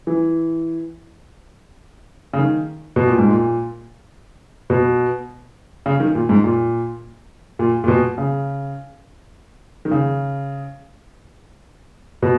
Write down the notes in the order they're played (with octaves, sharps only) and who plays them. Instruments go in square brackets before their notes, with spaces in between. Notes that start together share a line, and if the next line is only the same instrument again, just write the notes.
[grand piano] E3
C#3
D#3
B2
A#2
G#2
A#2
B2
C#3
D#3
A#2
G#2
A#2
A#2
A#2
B2
C#3
D#3
C#3
B2